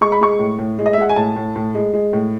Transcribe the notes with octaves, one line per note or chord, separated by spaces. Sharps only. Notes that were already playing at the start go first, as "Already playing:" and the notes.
G#3 C#6
B5
G#3 C#6
A2
A2
G#3
D#5
E5
G#3 F#5
G#5
A2 A5
A2
A2
G#3
G#3
A2